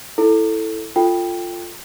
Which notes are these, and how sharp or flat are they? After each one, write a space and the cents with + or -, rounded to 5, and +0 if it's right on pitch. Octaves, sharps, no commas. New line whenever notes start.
E4 +0 A4 +0
F4 +0 A4 +20 G5 +5